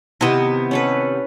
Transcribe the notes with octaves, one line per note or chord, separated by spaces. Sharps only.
C3 D#3 B3 E4 D#5
C#4 A4 B4